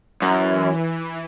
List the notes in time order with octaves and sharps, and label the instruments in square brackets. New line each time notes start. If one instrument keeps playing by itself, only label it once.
[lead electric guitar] F#2 [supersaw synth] E3